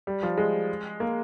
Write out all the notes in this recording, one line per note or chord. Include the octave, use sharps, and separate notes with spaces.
G3
F3
G#3
A#3